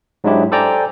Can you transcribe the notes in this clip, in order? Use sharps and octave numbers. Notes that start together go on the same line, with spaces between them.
G#2 F#3 G#3 D4 E4 G4
A4 C5 D5 G5 G#5 A#5